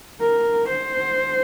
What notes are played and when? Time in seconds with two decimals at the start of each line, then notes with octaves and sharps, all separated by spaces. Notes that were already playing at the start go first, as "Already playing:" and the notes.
0.20 A#4
0.69 C5